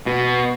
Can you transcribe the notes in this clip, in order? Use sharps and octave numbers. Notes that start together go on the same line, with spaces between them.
B2